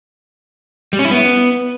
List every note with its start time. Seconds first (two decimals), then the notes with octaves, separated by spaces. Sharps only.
0.93 G3
0.99 C#4
1.05 E4
1.11 B3